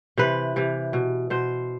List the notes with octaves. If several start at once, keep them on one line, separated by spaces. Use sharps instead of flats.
C3 E3 B4
C3 E3
B2
B2 C5